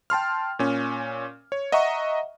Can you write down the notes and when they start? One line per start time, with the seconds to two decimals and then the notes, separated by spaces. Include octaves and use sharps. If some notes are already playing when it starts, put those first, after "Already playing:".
0.10 G5 A5 C6 F6
0.59 A#2 C#4
1.52 C#5
1.72 D#5 E5 F#5 A#5 C#6